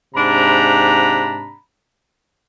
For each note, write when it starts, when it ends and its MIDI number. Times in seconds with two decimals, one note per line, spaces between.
0.14 1.57 44
0.14 1.57 48
0.14 1.57 62
0.14 1.57 82
0.14 1.57 83